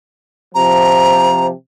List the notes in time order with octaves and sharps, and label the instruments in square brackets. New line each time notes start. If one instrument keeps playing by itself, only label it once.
[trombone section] C3 F3 [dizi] A#5